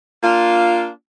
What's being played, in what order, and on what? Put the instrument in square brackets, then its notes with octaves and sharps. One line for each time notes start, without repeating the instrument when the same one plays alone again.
[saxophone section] A#3 D4 F4